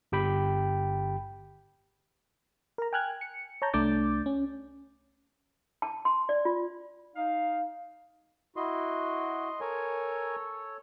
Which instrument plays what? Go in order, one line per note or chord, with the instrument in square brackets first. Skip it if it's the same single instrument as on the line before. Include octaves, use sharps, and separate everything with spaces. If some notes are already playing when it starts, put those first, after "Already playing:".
[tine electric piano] G1 G4 G5 B5
[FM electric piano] A#4 A#5
G5 G#5 F6 F#6 G#6
C#7
C#5 A5 A#5 G6
C2 A3 D4 D6 G6 A6
C#4
[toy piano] A5
C6
D5
F4
[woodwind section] D#4 F5
[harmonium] E4 F#4 [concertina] D#5 C6
[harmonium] A4 C#5 [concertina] A#4 G#5